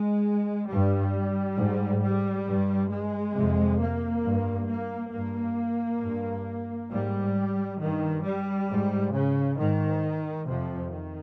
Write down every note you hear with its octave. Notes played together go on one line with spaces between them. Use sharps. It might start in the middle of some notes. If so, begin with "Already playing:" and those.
Already playing: G#3
G2 G3
G#2
G3
G2
G#3
F2 C3
A#3
G2
A#3
G2 A#3
G2
G#2 G3
G2 D#3
G3
G#2
C#3
G#2 D#3
F2 C3 F3
D#3